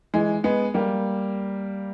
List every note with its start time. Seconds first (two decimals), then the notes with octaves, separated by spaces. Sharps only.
0.14 E3 G#3
0.44 G#3 B3
0.74 G3 A#3